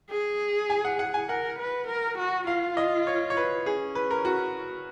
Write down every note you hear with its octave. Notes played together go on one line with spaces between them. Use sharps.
G#4
G#5
F#5
F#5
G#5
A#4 F#5
B4
A#4
F#4
F4 F5
D#5
C#5
C#5
B4
C#4 G#4
B4
A#4
F#4